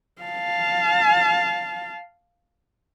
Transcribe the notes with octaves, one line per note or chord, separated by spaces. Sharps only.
F5 A5